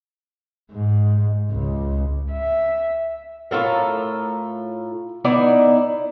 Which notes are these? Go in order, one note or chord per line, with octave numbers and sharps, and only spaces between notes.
G#2
C#2
E5
A2 F4 A4 A#4
B3 D#4 E4 D5